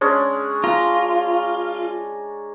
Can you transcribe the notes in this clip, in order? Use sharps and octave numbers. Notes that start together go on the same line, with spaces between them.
G#3 C#4 D4
F4 A#5